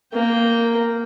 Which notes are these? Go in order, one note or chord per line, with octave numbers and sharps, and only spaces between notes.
A#3 G5